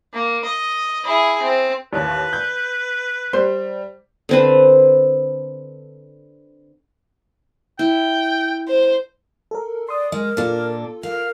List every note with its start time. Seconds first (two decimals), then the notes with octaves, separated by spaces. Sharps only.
0.13 A#3
0.44 D#5
1.04 E4 G#4
1.42 C4
1.93 A1 D#2 B4
2.33 G6
3.33 G3 C5
4.29 D3 C4 B4
7.79 E4 G5
8.68 C5
9.51 A4 A#4
9.89 D5 C6 D#6
10.12 G#3 A#4 D#5
10.37 A#2 D4 F4 A4
11.03 A#4 F5